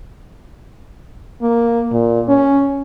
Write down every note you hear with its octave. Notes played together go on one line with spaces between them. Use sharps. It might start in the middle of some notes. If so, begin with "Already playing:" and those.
A#3
A#2
C#4